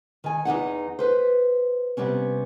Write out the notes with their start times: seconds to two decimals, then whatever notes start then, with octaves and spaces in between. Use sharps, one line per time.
0.24 D#3 G#5
0.45 E2 E3 D#4 F#5
0.99 B4 C5
1.97 C3 G3 B3 C#4